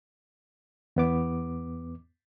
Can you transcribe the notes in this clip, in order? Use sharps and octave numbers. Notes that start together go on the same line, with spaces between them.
E2 B3 D6